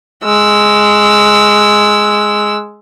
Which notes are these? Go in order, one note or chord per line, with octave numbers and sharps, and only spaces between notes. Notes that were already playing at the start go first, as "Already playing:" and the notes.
G#3 E6